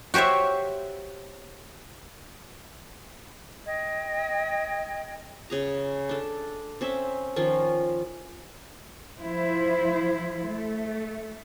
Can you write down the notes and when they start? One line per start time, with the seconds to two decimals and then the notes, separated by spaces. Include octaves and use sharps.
0.14 F#4 G4 C5 C#5 E5
3.66 D#5 G5 G#6
5.50 C#3 G#4 A#5
6.09 D4 A4
6.81 C4 C#4 E5
7.36 D#3 F3 C#4 F4
9.18 F3 E4 C5
10.48 A3